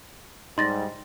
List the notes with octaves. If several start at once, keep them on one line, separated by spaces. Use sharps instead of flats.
G#2 G3 D#4 C6 A6 A#6